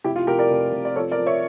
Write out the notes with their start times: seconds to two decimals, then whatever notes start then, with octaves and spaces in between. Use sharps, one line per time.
0.04 F1 E4 G4
0.16 F4
0.27 F1 G4 A#4
0.39 A#4 D5
0.50 F1
0.73 F1
0.85 D5
0.96 F3 A4 C#5
1.11 A#4 D5
1.18 F3
1.26 C#5 E5